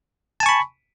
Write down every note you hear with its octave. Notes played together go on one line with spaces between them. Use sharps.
G#5 A5 B5 C#6